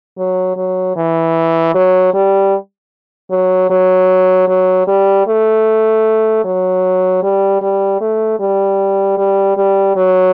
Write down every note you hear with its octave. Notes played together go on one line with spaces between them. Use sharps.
F#3
F#3
E3
F#3
G3
F#3
F#3
F#3
G3
A3
F#3
G3
G3
A3
G3
G3
G3
F#3